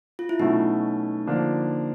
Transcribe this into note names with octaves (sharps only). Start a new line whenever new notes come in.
F4
E4
B2 F#3 A3 C#4 D#4 E4
D3 F3 A#3 D4